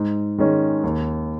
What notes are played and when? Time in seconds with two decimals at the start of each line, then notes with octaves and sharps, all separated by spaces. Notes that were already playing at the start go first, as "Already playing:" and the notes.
Already playing: G#2
0.38 D#3 G#3 C#4
0.84 D#2